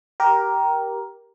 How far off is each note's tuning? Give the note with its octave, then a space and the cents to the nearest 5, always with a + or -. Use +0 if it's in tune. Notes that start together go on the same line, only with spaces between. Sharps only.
G4 -10 A#4 +10